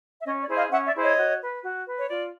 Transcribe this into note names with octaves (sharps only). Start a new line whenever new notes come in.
E5
C#4 C#5 D#5
D5
E4 G#4 C5
D#5 F5
C#4 E5 F#5
D5 E5
E4 G#4 C5
C#5 D#5
F#4
B4
F#4
B4
C#5
F4 D5